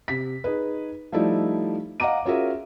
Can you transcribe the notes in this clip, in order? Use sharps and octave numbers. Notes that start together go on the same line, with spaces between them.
C3 B6
D#4 G#4 B4
F3 G3 A3 D#4 E4 D5
D#5 F5 F#5 A#5 D6 D#7
C#4 F4 F#4 G#4 A#4 E5